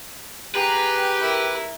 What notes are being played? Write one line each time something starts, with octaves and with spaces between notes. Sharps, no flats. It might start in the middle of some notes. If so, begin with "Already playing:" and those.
G4 G#4 B4 A#5
E4 A#4